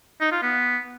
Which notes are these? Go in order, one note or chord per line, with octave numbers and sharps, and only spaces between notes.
D#4
F4
B3